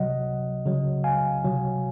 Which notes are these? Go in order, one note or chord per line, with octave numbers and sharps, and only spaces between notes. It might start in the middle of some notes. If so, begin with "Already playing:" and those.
Already playing: C3 F#3 D#5 F#5
C#3 F#3
F5 G#5
C3 F#3